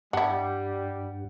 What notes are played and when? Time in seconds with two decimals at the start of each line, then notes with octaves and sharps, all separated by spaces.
0.13 G2 G3 D4 E4 F#5